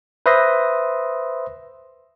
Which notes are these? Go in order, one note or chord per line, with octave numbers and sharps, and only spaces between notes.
B4 C5 E5 C6 D#6 A#6